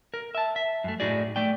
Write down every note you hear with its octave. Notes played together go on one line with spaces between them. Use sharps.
A#4
E5 A5
E5
F#2 A3
A2 D#4 F#4 G#4 D5
A3 D5 G5